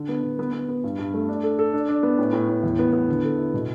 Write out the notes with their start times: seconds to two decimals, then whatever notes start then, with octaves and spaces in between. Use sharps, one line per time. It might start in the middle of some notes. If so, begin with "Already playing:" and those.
Already playing: D3
0.09 B3
0.23 D3
0.39 B3
0.53 B3
0.69 B3
0.84 G2
0.99 G2
1.14 A3
1.28 D4
1.43 A4
1.59 A4
1.73 D4
1.89 D4
2.03 B3
2.19 A2
2.33 A2
2.49 A2
2.63 E2
2.79 B3
2.93 B3
3.08 D3
3.24 A4
3.38 E4
3.54 B2